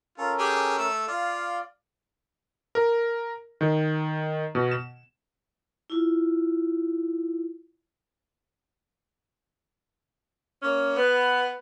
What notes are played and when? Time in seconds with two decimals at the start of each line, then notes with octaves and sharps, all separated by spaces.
0.18 C#4 F4 A4 A#4
0.39 G4 G#4
0.78 A3 E6
1.08 F4 D5 F5
2.75 A#4
3.61 D#3
4.55 B2
4.71 E7
5.90 E4 F4
10.62 A#3 C#4
10.96 B3